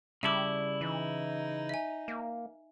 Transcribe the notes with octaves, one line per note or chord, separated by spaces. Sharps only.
C#3 G3 E4 E5 A5 D6
E3 D#4
E5 G#5
A#3